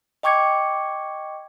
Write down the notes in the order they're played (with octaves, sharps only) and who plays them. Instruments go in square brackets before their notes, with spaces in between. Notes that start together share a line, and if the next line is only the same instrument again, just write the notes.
[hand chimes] D#5 G5 C#6 D6 G#6 C#7